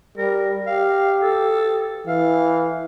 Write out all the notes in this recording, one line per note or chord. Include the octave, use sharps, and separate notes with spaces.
G3 A#4
G4 F5
A4
E3 F5